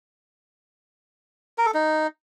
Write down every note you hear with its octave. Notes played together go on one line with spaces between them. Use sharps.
A#4
A4
D#4